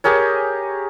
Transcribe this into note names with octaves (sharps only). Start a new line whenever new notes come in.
G4 G#4 A#4 C#5